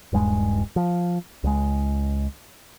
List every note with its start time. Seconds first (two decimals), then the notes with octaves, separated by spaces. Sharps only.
0.13 D#1 G2 G3 G#3
0.76 F3
1.44 C#2 G#3